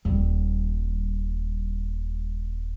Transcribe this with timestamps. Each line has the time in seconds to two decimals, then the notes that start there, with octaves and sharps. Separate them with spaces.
0.05 D#1 G3